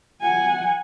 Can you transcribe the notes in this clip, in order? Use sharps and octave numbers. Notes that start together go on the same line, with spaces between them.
F#5 G#5